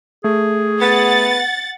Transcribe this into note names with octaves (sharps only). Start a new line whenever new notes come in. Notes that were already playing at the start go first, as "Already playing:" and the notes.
A3 G#4
B3 F#5 A6